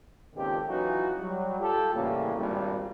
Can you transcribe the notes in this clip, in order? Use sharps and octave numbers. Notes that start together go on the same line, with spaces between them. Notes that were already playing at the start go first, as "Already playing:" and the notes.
C#2 A#2 D#3 C4 G4 A4
E3 F#3 C#4 D#4 F4 F#4
F#3 G3
F4 G4 A4
A2 C#3 E3 G3 A#3
G#1 G2 A#2 G3